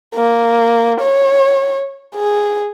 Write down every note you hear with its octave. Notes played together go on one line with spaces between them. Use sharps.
A#3
C#5
G#4